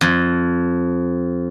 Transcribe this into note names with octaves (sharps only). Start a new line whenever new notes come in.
F2